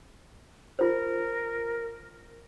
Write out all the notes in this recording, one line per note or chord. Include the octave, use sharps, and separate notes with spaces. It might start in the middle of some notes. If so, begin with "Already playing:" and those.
F4 A#4 C5